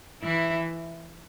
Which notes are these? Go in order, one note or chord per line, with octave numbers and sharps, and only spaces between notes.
E3 E4